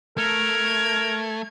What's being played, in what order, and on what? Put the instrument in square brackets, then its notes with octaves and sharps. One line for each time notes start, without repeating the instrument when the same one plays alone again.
[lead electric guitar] A3 [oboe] A#4 [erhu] G#6